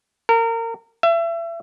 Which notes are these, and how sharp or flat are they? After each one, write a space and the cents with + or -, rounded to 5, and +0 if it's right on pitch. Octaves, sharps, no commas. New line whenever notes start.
A#4 -30
E5 +30